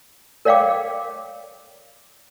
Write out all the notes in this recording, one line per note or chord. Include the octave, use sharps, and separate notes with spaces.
A#4 C#5 D5 F5 G5 D6